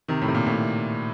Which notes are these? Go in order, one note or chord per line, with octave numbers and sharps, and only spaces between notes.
C3 D#3
A2
C3
A#2
A2 C3